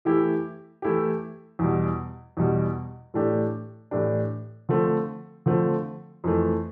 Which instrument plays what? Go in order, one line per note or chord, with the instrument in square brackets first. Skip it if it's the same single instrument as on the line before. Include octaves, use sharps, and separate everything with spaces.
[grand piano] E3 A3 E4 G4
E3 A3 E4 G4
E2 B2 G3
E2 B2 G3
A2 E3 A3 D4 G4
A2 E3 A3 D4 G4
D3 F3 A3 C4
D3 F3 A3 C4
F2 E3 A3